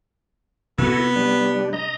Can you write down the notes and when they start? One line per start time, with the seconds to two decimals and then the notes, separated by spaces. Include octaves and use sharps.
0.78 C3 A#3 B3 E4 F#4 A4
1.16 G3 D4
1.73 D#5 A#5